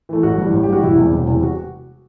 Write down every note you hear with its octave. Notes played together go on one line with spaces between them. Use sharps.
E3 A3
A1 F#4
G2 E3 G3
A1
G4
G2 E3 G3 F#4
E1 E4
E2 C3 G3
E1
E2 C3 G3
F#4